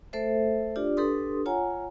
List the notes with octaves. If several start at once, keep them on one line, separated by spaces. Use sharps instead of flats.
A3 A4 C5 E5
D4 F4 G4 D5
D4 G4 A4 B4 C6 D#6
F4 C#5 F#5 G#5 A#5